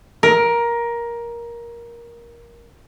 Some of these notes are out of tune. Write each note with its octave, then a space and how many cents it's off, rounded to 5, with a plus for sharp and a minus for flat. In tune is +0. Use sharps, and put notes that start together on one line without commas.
A#4 +15